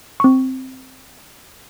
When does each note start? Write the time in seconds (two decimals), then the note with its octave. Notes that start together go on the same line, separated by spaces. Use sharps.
0.20 C4 C#6